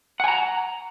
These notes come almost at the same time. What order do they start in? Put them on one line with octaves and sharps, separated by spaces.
F#5 G#5 A#5